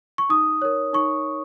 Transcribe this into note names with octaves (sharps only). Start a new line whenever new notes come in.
C#6
D#4 D#6
A#4 C#5
D#4 C#6